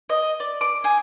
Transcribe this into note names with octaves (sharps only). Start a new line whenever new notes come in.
D#5
D5
D6
G#4